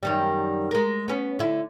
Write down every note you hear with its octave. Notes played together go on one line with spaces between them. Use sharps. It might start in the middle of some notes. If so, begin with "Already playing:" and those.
F#2 D#3 G3
G#3 A#4
B3 C#4
D3 E4